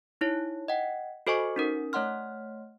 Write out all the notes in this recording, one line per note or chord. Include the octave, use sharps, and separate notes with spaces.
D#4 E4 C#5
D#5 F#5 G5
F#4 A4 C5 D#5 G#5 C#6
C#4 D#4 A#4
A3 C#5 D#5 F#5 C6 F6